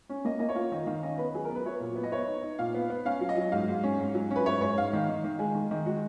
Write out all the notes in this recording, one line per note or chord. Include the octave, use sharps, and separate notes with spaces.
C#4
A#3 D#5
A#3 D#5
C#5
F4
D#3 D#5
D#3 F5
C#4 D#5
B3 B4
F#3 G#4
A#4
B3
B4
F#3 C#5
A#2
B3
D#5
B3 C#5
D#4
D#4
A#2 F5
B3
B3
C#4 F5
F#3
D#5
F#3
G#2 F5
G#2
C#4
G#2
F#3
C#4
B4
G#2 C#5
G#2 C#5
G#2 F5
D#3
D#3
D#3
G#3 G#4
D#3
D#3
G#3 F#4